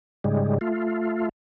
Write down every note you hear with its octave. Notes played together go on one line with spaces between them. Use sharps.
G#2 C#3 G3 G#3
A3 F4